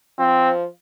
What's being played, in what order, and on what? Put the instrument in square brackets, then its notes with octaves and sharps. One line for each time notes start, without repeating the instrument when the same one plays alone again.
[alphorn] F3 [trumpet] C4